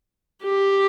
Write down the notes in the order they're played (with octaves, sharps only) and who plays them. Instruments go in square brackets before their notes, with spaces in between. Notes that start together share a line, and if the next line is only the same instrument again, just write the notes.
[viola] G4